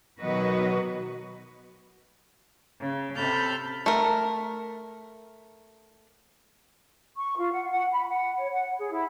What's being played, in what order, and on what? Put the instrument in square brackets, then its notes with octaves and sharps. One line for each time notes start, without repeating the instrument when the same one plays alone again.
[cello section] B2 D#3 F#3 F#4 B4 D#5
[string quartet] C#3
C3 A4 A5 B5 F6 G6
[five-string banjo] A3 A#4
[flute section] C#6
F4
F#5
F#5
B5
F#5
C#5
F#5
G#4
E4